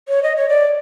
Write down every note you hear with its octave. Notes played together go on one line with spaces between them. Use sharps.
C#5
D#5
C#5
D5